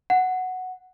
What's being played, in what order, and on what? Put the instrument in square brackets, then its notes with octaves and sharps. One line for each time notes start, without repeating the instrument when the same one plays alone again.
[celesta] F#5